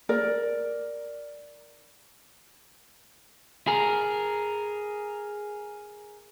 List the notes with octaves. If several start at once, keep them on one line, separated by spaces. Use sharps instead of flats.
A#4 D5
G#4 A#4